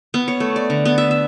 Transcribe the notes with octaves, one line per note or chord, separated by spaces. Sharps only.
B3
C#5
A3
D5
D3
B3
E5
E5